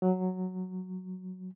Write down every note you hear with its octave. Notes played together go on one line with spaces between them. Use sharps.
F#3